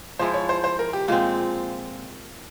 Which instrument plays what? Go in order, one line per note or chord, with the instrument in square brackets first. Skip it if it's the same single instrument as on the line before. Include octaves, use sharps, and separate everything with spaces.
[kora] F3 G#3 E4 [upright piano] C5
[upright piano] C#5
C5
C5
A#4
G4
[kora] A#2 G#3 C4 [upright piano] F4